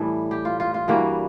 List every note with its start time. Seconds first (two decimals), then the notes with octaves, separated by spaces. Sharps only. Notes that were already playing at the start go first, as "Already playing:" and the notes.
Already playing: A2 E3 G3 A4
0.31 G4
0.45 F4
0.60 F4
0.74 F4
0.88 G2 E3 G3 A#3 F#4